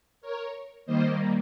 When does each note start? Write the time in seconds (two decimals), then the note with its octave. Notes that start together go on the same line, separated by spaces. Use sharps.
0.21 A#4 C#5
0.86 D#3 G3 A#3 C5 D#5